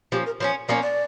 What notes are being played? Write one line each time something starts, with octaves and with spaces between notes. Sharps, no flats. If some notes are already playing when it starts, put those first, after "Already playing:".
F3 A#3 C#4 G4
A#4
F3 A#3 C#4 C#5
F3 A#3 C#4 D5
D5